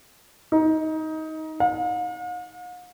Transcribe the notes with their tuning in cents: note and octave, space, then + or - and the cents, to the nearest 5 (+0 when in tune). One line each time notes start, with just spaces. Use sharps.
D#4 +20
F5 +45